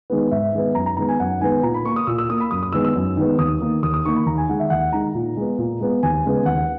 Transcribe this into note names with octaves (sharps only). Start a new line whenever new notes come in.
D#3 G#3 B3
G#2 E5
D#3 G#3 B3
F#2 A#5
A#5
D#3 G#3 B3 A#5
G#5
F#2 F#5
D#3 G#3 B3 G#5
A#2 A#5
B5
A#3 C#6
D#6
A#2 E6
E6
A#3 D#6
B5
F#2 D#6
D#6
D#3 G#3 B3 E6
E6
F#2
D#3 G#3 B3
D#2 D#6
D#3 A#3
D#2 D#6
D#6
D#3 A#3 C#6
B5
D#2 A#5
G#5
D#3 G#3 F#5
E5
D#2 F#5
D#3 G#3 A#5
A#2
G#3 B3
A#2
G#3 B3
D#2 G#5
C#3 G#3 B3
D#2 F#5